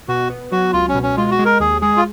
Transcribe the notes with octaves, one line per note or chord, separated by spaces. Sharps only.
B2 F#4
B3
F#3 F#4
C#2 F4
C#4
B2
C#4
G#3 F4
F#4
G#3
A#4
D#2 G#4
G#3 G#4
F4